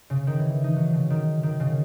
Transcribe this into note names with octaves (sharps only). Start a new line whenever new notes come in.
C#3
D#3
E3
D#4
F#3
C#3
D#3
D#3
C#3